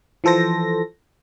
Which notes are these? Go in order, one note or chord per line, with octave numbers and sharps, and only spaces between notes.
E3 F3 A4 C5 A#6